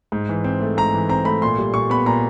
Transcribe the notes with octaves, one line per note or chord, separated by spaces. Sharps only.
G#2
E3
C4
A3
G#2 A#5
E3
C4 A#5
A3 B5
A#2 C6
G3
A#2 C#6
B3 B5
A#2 A#5